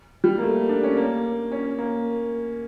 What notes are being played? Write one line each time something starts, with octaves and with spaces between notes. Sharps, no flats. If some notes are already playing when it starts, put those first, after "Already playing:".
G3
A#3
A3
D4
C#4
A#3
C#4
A#3